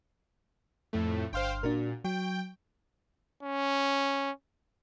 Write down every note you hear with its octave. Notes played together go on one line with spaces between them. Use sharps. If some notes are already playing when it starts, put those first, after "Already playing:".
F2 A2 A3
G1 C5 F5 G5 C6 F6
A#2 D4 F#4 A#4
F#3 G5
C#4